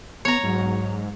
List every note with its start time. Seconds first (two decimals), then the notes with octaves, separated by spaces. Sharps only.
0.25 B3 C#5 A#5
0.43 G#2 F#3